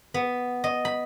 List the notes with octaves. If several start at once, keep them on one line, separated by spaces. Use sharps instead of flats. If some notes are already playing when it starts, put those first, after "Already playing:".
B3
D#5
B5